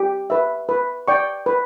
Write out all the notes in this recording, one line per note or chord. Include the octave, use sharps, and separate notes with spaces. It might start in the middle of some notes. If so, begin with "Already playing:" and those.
Already playing: G4
B4 E5
B4
D5 G5 C#6
B4